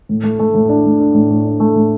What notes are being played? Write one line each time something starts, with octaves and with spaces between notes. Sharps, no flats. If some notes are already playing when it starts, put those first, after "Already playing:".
A2
A3
A3
A2
D4
A3
D4
A2
A2
D4
A3
A2